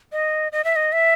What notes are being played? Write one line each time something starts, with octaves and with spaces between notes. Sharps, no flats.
D#5
D#5
E5
D#5
E5